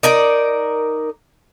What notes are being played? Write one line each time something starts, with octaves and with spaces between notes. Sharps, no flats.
D#4 A#4 D5